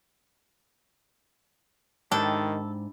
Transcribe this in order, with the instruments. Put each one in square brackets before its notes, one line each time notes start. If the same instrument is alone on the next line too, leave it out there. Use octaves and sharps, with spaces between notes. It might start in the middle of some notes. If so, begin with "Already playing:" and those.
[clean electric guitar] G#2 [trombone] D#3 [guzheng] D4 E4 G4 [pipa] A4